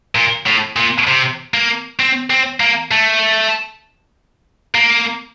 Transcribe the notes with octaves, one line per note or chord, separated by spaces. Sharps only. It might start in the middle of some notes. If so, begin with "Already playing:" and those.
A#2
A2
A#2
C3
A#3
C4
C4
A#3
A3
A#3